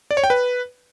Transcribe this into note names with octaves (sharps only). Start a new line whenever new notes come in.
D5
C#5
G5
B4